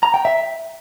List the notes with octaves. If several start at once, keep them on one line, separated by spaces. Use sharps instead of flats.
A#5
G5
E5